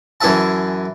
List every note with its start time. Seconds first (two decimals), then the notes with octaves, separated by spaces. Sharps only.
0.21 F#2 E3 G#4 E5 A5